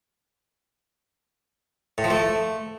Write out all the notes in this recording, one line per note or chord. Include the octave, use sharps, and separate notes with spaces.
A2
F3
A3